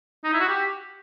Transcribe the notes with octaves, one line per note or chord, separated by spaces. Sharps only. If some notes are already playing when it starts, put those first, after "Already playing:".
D#4
E4
F#4
G4